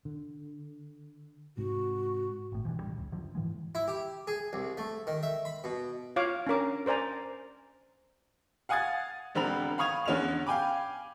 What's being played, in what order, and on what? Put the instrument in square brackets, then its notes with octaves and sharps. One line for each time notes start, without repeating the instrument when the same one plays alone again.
[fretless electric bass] D3
[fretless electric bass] G#2 C3 [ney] F#4
[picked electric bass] G#1 A2
G2 B2 E3 F3
E1 A1 G3
F#1 C#2
F#2 D3 F3
G#2 E3 F3 G#3
[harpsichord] E4
G4
G#4
C2
A3
D#3
E5
B5
B2
[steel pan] F4 C#5 F5 D6
C#4 D4 A#4 D6
A#4 C5 D5 G#5 A#5
[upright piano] F5 F#5 G#5 D#6 G#6 A6
E1 D3 C4 A#4 B5 F7
F5 B5 C#6 D#6 G#6 F7
E2 D3 C#4 F6 F7
F5 G5 G#5 B5 D6